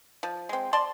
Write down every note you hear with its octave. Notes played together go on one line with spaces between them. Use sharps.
F3
G#3 C4
D5 A5 C6